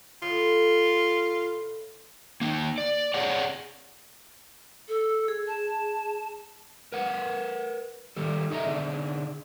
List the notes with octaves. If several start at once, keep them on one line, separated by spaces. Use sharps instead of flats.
A2 D#3 F4 A4
A#3 D#4
D5
G#4 C#5 D5 F#5
A4
G#4
A5
A#4 B4 F#5
D#3 G3 A4
D#4 A4 D#5 E5 A#5
D3 D4 D#4 G#4